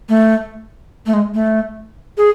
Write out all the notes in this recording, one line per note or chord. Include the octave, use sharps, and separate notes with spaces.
A3
A3
G#3
A3
G#4